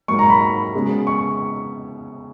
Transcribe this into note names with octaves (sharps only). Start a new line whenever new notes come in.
G#2 F#3 A#3 C#6
A#5
B5
C#3 G#3 B3
C#6